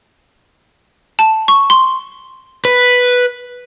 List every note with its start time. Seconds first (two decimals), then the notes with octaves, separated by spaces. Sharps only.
1.19 A5
1.48 C#6
1.70 C6
2.65 B4